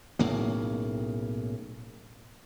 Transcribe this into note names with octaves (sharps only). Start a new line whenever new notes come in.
B1 A2 C#3 A#3